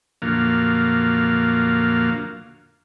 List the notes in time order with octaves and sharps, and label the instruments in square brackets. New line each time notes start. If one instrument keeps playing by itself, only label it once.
[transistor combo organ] F2 A#2 D3 F#3 A#3 F5